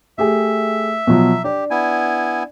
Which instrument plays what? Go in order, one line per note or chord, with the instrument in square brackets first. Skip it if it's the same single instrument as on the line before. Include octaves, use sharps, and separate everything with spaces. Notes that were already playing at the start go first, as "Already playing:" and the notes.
[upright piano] A3 G4 G#4 [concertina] E5
[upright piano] B2 F3 F#3
[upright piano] D4 [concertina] G4
[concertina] B3 E4 G#5